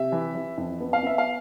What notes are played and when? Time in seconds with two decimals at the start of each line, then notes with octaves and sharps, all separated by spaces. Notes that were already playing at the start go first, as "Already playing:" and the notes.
Already playing: C3 E5
0.12 E3
0.35 E3
0.58 F2
0.80 B3
0.93 F5
1.03 B3 E5
1.18 F5